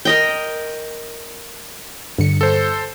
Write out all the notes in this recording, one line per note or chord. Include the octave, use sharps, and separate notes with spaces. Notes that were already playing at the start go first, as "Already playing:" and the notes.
A#4 D#5 G5
G2 D3 C#7
A4 C5